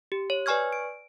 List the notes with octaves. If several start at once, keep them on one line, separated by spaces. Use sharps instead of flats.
G4
C#5
B4 D5 G#5 C#6 F6 G#6
D7